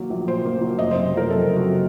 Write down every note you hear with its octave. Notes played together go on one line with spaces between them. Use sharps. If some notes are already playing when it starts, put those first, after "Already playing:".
Already playing: D#3 F#3 A#3
A#1
A#2 C5
A#3
F#3
F#1 D#5
C3 C5
F#1 A#4
F2 A4
F#1
F#4
C3